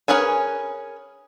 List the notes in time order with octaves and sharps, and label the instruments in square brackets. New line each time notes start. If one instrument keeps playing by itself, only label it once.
[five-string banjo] C#4 G#4 A#4 B4 G#5